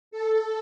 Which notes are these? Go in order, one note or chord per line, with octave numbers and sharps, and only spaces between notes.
A4